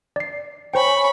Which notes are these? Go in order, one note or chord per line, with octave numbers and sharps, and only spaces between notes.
D5 C7
C5 C#5 G5 G#5 B5 C#6